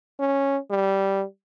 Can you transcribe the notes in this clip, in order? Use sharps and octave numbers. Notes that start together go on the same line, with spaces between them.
C#4
G3